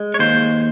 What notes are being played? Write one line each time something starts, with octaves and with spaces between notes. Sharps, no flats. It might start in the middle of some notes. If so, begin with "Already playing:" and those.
Already playing: G#3
C#5
D#2 C5